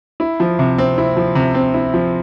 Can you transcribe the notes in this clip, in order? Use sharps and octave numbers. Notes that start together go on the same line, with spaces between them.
E4
F3
C3
C4
E4
F3
C3
C4
E4
F3